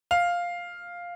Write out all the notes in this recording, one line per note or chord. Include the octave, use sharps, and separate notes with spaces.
F5